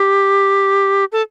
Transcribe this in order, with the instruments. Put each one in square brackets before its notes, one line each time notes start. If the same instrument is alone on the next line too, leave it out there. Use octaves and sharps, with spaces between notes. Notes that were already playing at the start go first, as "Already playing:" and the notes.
Already playing: [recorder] G4
A4